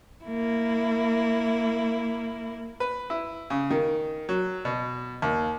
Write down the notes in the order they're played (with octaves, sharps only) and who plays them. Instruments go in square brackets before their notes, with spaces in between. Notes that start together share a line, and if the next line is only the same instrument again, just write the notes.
[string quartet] A#3 E4
[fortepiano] B4
E4
C#3
D#3
F#3
B2
D#2